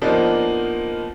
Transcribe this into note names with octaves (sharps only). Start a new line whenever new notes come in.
F3 A#3 B3 D4 D#4 F4